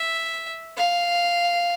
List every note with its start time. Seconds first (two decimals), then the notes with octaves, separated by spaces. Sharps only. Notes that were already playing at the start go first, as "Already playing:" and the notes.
Already playing: E5
0.77 F5